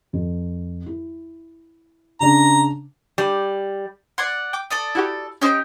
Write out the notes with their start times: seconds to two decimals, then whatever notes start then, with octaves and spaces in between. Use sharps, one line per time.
0.13 F2
0.86 E4
2.21 C#3 D4 A#5
3.18 G3
4.18 D5 F#5 C6 G#6 C7
4.53 G5 D6
4.70 A4 D5 D#6
4.95 E4 F#4 G4
5.41 C#4 D#4 G4 C5 D7